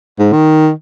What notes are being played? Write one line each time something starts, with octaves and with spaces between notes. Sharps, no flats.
G#2
D#3